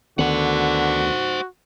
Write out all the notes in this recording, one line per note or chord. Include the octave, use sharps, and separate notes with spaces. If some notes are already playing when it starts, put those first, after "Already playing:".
D2 D3 D#3 B3 F#4 C5 F#5